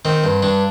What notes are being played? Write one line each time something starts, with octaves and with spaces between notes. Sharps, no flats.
D#3 C4
G2
G2 D4